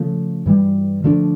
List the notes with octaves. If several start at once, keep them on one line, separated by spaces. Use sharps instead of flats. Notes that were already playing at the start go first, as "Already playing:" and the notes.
Already playing: C#3 F3 A3
G2 E3 G3
D3 F3 A3 D4